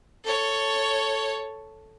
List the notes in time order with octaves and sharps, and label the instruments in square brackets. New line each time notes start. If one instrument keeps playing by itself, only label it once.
[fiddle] A4 C#5